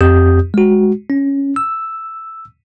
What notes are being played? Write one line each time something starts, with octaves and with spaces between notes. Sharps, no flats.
F2 C4 G4 D#6 G6
G#3 F#4
C#4
E6